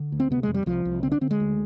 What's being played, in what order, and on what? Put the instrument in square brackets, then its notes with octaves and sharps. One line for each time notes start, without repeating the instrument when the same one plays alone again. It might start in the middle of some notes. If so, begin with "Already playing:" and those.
Already playing: [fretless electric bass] D3
D2
C4
C3 B3
F2 G#3
G3
C2 F3
C2
D3 C4
D4
D3 C4
G#3
D2